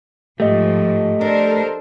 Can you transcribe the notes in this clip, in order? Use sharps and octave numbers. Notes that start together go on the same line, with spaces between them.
G#2 F3 A3 G4 D#5
D4 A4 A#4 C5